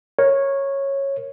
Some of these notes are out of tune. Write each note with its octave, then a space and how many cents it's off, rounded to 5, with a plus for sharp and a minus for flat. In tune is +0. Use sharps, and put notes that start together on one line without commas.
A#4 +10 C#5 -10